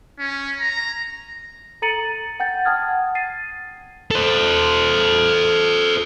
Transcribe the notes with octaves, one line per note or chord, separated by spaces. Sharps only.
C#4
A#5
A4 A#5 A6 C#7 D#7 F#7
F#5 G5 G6 A6
F#5 G5 A5 D#6 F6 G#6
A6 C7 D#7
A4 C5